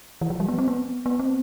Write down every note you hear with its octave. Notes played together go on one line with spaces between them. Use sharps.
E3
F3
G3
B3
C4
B3
B3
C4